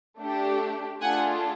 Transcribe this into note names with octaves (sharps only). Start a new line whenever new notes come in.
A3 D4 G4
A3 D4 F4 G#4 F#5 G#5